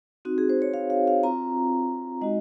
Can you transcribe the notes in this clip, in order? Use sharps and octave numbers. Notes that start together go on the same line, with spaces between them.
C4 D#4 F#4
G#4
C5
C#5
F5
F5
F5
C4 F4 A#5
G#3 D#4 F#4 D#5